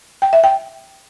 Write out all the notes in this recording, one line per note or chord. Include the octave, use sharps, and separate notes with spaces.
G5
E5
G5